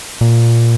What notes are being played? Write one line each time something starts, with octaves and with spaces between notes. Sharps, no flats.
A#2